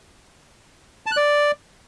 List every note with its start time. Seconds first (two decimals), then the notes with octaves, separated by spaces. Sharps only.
1.06 A5
1.12 F#6
1.17 D5